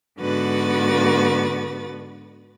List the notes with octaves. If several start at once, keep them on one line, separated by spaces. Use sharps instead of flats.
G#2 D3 B3 F#4 B4 A6